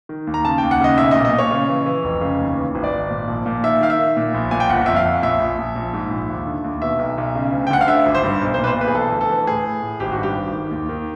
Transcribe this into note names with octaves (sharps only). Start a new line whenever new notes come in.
D#3
D#2
A#5
C#3 A5
D#2 G5
F#5
C#3 D#5
B1 E5
A#2 D#5
D#5
A#2
C#5
C#3
E3
E3
F1
C#3
D#2
E3
G#1
D5
G#1
A#2
A#1
A#2
D#3 E5
D#3 F5
E5
D#3
A#2
A#1
A#2 G#5
G5
G1 F#5
F2 E5
F5
F2
A#1 E5
A#1
A#1
A#1
G#2
A#1
D#2
D3
D#2
B2 E5
B1
B1
C#3
D2
G5
D2 F#5
F5
D3 E5
G#1
C5
G2
B1
C5
A#2 B4
C5
B1 B4
G#4
E3 A4
D2
A4
E3
A2 G#4
A2
A2
G#1 G4
F#4
G2
G4
G#1
D#3
D#2
D#3